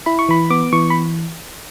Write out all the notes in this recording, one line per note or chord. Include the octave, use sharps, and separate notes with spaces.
E4 B5
C#6
E3 B5
B3 D6
E3 C#6
B5